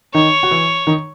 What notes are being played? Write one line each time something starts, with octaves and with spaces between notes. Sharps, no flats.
D#3 D#4 C#5
F#4
E3 E4
D#3 D#4